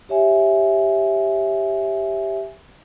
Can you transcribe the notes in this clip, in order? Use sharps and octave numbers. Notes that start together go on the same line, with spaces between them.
G4 C#5 E5 G#5